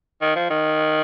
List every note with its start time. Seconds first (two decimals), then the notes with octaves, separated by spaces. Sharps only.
0.21 D#3
0.36 F3
0.50 D#3